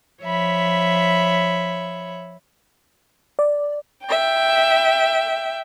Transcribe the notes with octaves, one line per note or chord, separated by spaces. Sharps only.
F3 C#5 E5 B5
D5
E5 G5